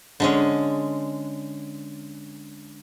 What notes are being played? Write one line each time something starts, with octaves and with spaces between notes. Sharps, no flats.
D3 G#3 C#4